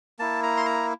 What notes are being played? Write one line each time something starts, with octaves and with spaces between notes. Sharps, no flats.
A#3 E4 A5
A#5
C6
A#5